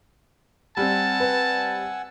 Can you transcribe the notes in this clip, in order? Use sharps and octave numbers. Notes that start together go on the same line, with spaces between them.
G3 C4 F#5 G#5 A5 E6
B4